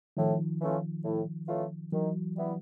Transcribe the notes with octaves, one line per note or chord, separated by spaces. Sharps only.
A2 D#3 F3
E3 A3 C#4 F4
A2
E3 A3 C#4 F4
D#3 E3 F#3
G3 B3 E4